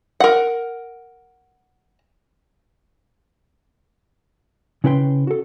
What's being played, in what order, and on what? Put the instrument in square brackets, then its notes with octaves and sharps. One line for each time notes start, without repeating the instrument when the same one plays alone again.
[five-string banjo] A#4 F#5
[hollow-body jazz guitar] C#3 C#4 E4 B4 G5 C6
F#4 A4